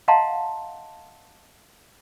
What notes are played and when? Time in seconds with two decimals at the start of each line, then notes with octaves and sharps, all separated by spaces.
0.08 D#5 F5 F#5 A5 A#5 C6